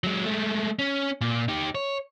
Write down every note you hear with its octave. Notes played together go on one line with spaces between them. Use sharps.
F#3 G#3
G#3 A3
C#4
A#2
D#4 G4
C#5